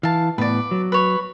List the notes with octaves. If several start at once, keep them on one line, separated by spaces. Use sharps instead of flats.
E3 F5 A5
A2 B3 B4 D5
F#3
B4 C#5